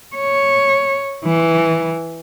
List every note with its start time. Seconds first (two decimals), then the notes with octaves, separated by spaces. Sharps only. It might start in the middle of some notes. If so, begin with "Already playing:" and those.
0.16 C#5
1.25 E3